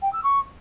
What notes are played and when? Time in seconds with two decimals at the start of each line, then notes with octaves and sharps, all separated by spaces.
0.02 G5
0.13 E6
0.24 C#6